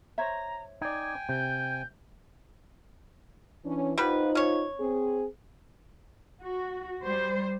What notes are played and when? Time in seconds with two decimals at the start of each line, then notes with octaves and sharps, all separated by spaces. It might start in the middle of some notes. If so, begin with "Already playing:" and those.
0.18 C5 C#5 E5 A#5
0.81 D#4 D5 G5 G#5 G#6
1.29 C3 G6
3.65 E3 C#4 D4
3.98 G3 B3 D#4 F4 B4 C5
4.35 C#4 C#5
4.80 C4 G#4
6.41 F#4
7.03 G3 C5